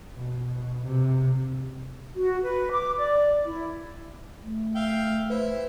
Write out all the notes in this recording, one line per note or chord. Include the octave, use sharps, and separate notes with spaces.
B2
C3
F#4
B4
D6
D5
E4
A3
E5 F5 G5
E4 B4 C5